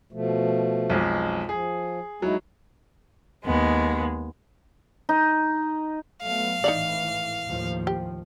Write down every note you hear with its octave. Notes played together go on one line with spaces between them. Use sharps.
B2 F3 A3
B1 F2 G#3
F3 G#4
F#3 G#3 D#4 E4
D#2 G#3 B3
D#4
F#3 A3 B3 F5
G#1 A2 E3 D#4 E4 D5
D#2 A2 F3
G4